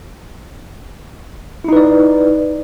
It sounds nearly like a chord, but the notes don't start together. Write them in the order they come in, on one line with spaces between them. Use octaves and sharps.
E4 D#4 B4 D5